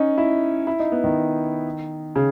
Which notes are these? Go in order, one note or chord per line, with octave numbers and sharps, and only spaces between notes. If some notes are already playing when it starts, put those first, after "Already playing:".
Already playing: C#4 D#4
E4
E4
D#4
B3
D#3
C#3